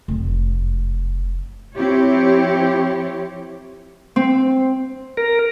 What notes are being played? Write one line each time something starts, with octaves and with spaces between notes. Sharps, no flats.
F1 F#2
F3 C4 E4 G4 C#5
C4
A#4